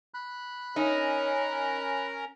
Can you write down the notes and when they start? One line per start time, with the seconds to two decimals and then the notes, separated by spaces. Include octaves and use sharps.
0.14 B5 F#6
0.76 C#4 D#4 A#4 C#5 A#5